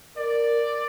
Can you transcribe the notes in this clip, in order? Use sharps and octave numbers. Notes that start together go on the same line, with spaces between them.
A#4 D5